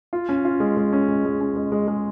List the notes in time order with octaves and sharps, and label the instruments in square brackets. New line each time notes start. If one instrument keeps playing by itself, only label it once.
[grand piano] F4
C#4
F4
G#3
G#3
C#4
G#3
G#3
C#4
G#3
G#3
G#3